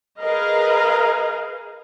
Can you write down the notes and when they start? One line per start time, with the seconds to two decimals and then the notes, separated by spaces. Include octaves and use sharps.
0.20 G#4 A#4 B4 D#5 F5